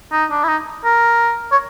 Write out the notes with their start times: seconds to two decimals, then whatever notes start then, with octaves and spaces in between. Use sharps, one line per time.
0.12 D#4
0.31 D4
0.44 E4
0.48 D#4
0.84 A#4
1.52 C#5